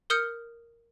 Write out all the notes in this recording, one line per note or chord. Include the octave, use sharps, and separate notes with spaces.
A#4 D#6 F6 G6 C#7 G7